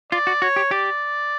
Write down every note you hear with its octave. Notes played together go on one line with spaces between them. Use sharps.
F4 D5
F#4
F#4 C#5
G4
G4 D5